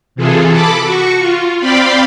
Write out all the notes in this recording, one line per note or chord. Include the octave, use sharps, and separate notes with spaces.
C3 E3 F4 G#4 A4
A4 A5 B5 D6
F#4 C#6
F4
C4 D5 F5 G5 B5 C6